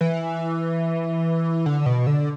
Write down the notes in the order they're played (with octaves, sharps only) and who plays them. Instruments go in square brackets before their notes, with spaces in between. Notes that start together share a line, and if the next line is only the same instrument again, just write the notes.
[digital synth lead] E3
D3
B2
D3